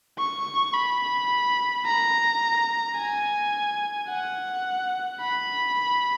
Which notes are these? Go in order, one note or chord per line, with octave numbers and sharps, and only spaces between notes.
C#6
B5
A#5
G#5
F#5
B5